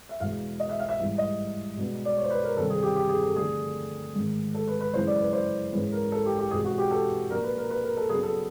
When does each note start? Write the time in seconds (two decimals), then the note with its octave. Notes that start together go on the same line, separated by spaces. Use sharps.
0.09 E5
0.20 E2 B2 G#3 F5
0.60 D#5
0.69 E5
0.79 F5
0.89 E5
0.98 G#2 E3 G3
1.18 D#5
1.77 B2 G#3 B3 D4
2.05 D5
2.17 C#5
2.24 C5
2.30 B4
2.44 A#4
2.57 E2 C3 D#3 G3 C4 A4
2.70 G#4
2.83 G4
2.96 G4
3.09 G#4
3.22 A4
3.35 D3 F3 A3 G#4
4.15 G#2 D#3 G#3
4.54 A4
4.67 B4
4.80 B4
4.93 F#2 C#3 E3 G#3 C5
5.07 D5
5.19 B4
5.33 C5
5.72 G#2 E3 G#3 C#4 B4
5.92 A#4
6.12 A4
6.26 G4
6.39 G4
6.51 E2 B2 G#3 C4 G#4
6.65 F#4
6.78 G4
6.91 A4
7.30 A#2 F3 A#3 D4 A#4
7.43 B4
7.57 A#4
7.70 B4
7.84 A#4
7.97 A4
8.09 C#3 F#3 B3 D4 G#4
8.23 A4